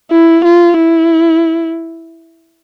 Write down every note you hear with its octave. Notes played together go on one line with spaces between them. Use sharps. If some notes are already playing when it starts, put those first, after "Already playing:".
E4
F4
E4